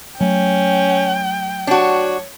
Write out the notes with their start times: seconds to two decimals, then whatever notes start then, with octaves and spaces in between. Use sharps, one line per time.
0.21 F#3 A3 C#4 G5
1.67 D4 F#4 C#5